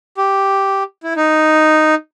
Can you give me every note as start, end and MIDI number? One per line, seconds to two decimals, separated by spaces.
0.17 0.83 67
1.03 1.13 64
1.16 1.95 63